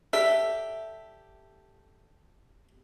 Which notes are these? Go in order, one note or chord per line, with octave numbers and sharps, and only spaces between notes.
G4 A4 D5 E5